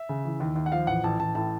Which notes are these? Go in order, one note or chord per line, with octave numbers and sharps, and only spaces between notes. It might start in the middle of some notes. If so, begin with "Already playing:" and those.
Already playing: E5
C#3
E3
D#2
D#2
F#5
F3 F5
A1 F#5
A1 A5
A1 A5
A2 A5